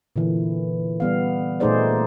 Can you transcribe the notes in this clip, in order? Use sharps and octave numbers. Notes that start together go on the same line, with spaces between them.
A#2 D3 E3
G3 B3 F5
A#2 A3 D#4 G#4 C5 D5